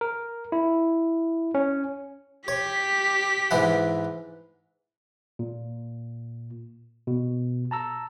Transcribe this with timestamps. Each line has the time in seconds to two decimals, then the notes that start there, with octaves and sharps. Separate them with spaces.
0.01 A#4
0.52 E4
1.55 C#4
2.48 G4 C#5 B6
3.51 G#2 E3 F#5
5.39 A#2
7.07 B2
7.71 A5 A#5 E6